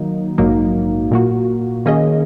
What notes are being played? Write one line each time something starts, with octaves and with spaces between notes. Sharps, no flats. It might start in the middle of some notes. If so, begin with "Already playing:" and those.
Already playing: D#3 F#3 A#3 D#4
A#1 G#2 F#3 A#3 D#4
A#2 A#3 F#4
D#3 A#3 C#4 G#4 D#5